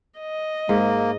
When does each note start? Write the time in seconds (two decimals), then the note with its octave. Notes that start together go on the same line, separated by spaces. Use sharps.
0.20 D#5
0.69 G#2 A#3